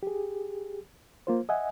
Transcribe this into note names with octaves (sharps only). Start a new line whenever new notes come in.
G4 G#4
A#3 F4 C5
D#5 E5 F#5 G#5